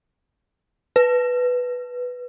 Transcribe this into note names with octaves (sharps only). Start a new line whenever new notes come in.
B4